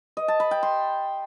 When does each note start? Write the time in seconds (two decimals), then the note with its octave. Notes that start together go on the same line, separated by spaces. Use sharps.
0.17 D#5
0.28 A5
0.40 B5
0.51 G5
0.63 C6